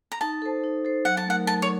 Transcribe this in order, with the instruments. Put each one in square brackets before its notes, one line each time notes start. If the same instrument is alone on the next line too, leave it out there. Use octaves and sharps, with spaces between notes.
[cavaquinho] A#5
[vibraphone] D#4 [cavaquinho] A5
[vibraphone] A4 C5
D#4
A4 C5
[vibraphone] F#3 [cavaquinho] F#5
[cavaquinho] A5
[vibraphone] A3 D#4 A#4 [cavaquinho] F#5
[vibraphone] F#3 [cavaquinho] A5
[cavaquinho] C#5